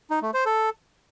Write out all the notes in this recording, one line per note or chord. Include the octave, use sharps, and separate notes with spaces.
D#4
A3
C5
A4